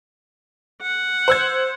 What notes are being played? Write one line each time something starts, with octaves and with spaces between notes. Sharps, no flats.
F#5
C5 E6 G#6